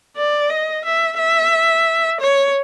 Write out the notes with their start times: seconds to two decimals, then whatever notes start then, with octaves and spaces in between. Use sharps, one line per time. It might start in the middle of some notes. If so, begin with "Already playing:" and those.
0.17 D5
0.50 D#5
0.85 E5
1.18 E5
2.21 C#5